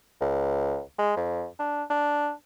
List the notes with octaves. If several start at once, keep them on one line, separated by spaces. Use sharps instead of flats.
C#2
G#3
F2
D4
D4